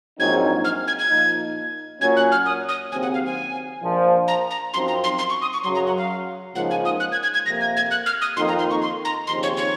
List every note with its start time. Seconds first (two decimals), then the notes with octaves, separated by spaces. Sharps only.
0.19 A#1 G#2 F#3 C4 D#4 G#6
0.64 F6
0.87 G#6
0.99 G#6
1.10 A#2 F3 A#3 D#4
2.01 A#2 F#3 C#4 G#6
2.16 F#6
2.32 F6
2.46 D#6
2.69 D#6
2.91 D#2 C#3 F#3 C4 G#5
3.03 F#5
3.14 F5
3.26 G#5
3.82 A#1 A#2 F3
4.28 A#5
4.50 A#5
4.73 F#2 F3 C4 D#4 C6
4.88 A#5
5.04 C6
5.18 C6
5.30 C#6
5.42 D#6
5.53 C#6
5.64 F#2 C#3 F#3 C6
5.75 A#5
5.87 F#5
5.97 F5
6.55 C#2 C#3 F3 A#3 D#4 F#5
6.70 G#5
6.85 D#6
7.00 F#6
7.12 G#6
7.23 G#6
7.34 G#6
7.46 F2 C3 F3 A#3 A#6
7.61 G#6
7.77 G#6
7.91 F#6
8.06 F6
8.21 D#6
8.36 F2 D#3 A#3 D#4 C6
8.48 A#5
8.59 C6
8.71 C#6
8.82 C6
9.05 A#5
9.27 D#2 C#3 F3 C4 D#4 C6
9.43 C#5
9.57 C#5